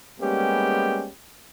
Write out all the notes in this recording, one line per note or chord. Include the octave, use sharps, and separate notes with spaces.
G3 G#3 A#3 B3 C#4 G4